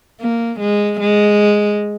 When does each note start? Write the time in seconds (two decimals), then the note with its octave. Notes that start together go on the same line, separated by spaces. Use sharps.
0.20 A#3
0.60 G#3
1.00 G#3